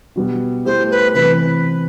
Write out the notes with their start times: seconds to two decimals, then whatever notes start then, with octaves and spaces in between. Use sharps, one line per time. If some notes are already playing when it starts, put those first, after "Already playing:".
0.16 B2 G3 B3
0.65 A3 E4 G4 C5
0.91 B4
1.14 C3 E3 B4